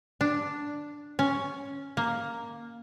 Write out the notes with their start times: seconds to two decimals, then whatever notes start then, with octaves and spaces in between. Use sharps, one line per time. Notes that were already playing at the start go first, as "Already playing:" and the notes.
0.21 D4
1.19 C#4
1.97 A#3